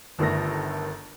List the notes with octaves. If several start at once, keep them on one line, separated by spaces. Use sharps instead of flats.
G1 D#3 A3 A#6